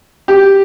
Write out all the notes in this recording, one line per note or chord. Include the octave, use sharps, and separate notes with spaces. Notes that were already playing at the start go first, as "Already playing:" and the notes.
G4